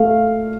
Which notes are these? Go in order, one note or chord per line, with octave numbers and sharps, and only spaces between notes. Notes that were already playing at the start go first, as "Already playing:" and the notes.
Already playing: A3 F5